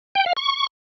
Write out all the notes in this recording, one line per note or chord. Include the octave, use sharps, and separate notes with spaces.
G5
F5
C#6